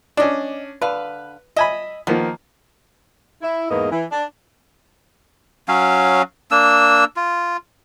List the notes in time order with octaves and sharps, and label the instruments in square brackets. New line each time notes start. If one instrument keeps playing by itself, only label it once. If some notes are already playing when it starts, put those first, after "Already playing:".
[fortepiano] C#4 D4 [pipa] D5 D#5
[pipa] D3 F5 [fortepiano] B4
[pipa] D#5 [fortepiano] E5 G#5 B5
[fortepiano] D#3 F3 A#3 [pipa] B3
[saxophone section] E4
E2 G#2 A#3 B3 E4 D#5
E3
D4
[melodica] F#3 C#4 F5
A#3 D4 E6
F4